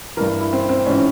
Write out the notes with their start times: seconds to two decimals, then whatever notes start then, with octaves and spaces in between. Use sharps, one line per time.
0.17 G2 E3 A#4
0.40 E4
0.53 C4
0.69 C4
0.86 G#2 E3 C#4